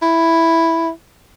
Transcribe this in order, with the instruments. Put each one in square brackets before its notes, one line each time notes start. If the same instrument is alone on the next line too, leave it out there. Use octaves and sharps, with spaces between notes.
[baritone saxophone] E4